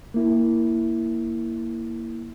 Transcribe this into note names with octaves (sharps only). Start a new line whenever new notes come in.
A#3 E4